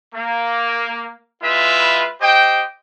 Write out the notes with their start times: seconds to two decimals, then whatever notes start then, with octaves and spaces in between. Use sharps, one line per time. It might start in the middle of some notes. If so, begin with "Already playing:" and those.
0.14 A#3
1.42 G#3 E4 F4 B4 E5
2.21 G4 C5 D#5 G5